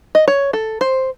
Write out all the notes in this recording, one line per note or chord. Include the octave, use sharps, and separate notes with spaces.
D#5
C#5
A4
C5